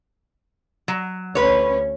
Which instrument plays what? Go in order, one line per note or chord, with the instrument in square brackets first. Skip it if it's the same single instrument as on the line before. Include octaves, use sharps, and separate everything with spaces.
[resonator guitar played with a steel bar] F#3
[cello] D2 C#4 [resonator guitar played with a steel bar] B4 C#5